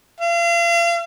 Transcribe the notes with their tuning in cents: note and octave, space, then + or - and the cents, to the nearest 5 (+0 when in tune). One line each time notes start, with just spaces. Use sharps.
F5 -40